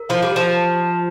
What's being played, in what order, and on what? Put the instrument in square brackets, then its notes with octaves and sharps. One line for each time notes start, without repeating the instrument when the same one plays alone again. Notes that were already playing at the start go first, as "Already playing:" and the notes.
Already playing: [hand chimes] A#4
[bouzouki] F3 [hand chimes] F5
[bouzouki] G3
[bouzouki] F3 [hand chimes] G4
[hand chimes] A5